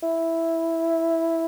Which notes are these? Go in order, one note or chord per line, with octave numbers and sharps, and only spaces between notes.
E4